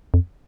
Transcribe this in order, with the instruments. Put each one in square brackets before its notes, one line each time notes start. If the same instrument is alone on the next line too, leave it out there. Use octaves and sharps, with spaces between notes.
[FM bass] F2